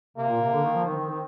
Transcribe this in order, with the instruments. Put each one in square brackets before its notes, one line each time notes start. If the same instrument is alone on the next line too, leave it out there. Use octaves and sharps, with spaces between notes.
[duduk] C3 [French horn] A#3
[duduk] A#2
C3
D3
D#3
F3
[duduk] D#3 [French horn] C4
[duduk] D#3
D#3